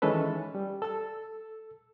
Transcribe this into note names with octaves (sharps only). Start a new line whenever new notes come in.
D#3 E3 G#3 C#4 A4 B4
G3
A4 E6